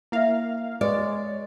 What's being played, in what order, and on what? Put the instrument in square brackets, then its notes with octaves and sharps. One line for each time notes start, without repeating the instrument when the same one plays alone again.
[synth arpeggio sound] A#3 F5 [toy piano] E4 E5
[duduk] G#3 [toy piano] B4 [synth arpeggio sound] C#5 [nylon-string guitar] D5